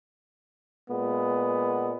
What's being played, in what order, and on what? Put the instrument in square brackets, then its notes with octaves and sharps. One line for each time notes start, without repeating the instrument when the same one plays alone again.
[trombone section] A#2 G#3 B3